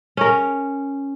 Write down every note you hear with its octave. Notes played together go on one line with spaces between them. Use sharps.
C#4 A#4